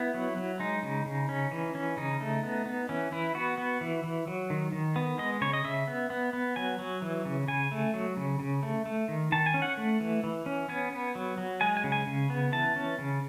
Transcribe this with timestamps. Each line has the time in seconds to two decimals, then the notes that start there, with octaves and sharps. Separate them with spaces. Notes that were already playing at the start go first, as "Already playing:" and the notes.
Already playing: B3 E4
0.14 F#3
0.37 F#3
0.60 G#3 D#4
0.83 C#3
1.06 C#3
1.29 C#4
1.51 E3
1.75 C#4
1.97 C#3 D#4
2.20 A3
2.43 B3
2.66 B3
2.89 E3 C#4
3.12 E3 E4
3.35 B3 F#4
3.58 B3
3.81 E3
4.04 E3
4.27 F#3
4.50 D#3
4.72 D#3
4.96 B3
5.18 G#3 D#5
5.41 C#3 C#5
5.53 D#5
5.65 C#3 E5
5.88 B3
6.10 B3
6.33 B3
6.56 F#3 G#5
6.79 F#3
7.02 E3
7.25 C#3
7.48 C#3 G#5
7.72 A3
7.94 F#3
8.17 C#3
8.40 C#3
8.63 A3
8.86 A3
9.08 D#3
9.32 D#3 A5
9.46 G#5
9.54 C#4
9.62 F#5
9.77 A3
10.01 E3
10.24 E3
10.46 C#4
10.69 B3 G#5
10.92 B3
11.15 F#3
11.38 F#3
11.61 G#3 G#5
11.77 G#5
11.84 C#3
11.92 G#5
12.07 C#3
12.30 B3
12.52 E3 A5
12.76 C#4
12.99 C#3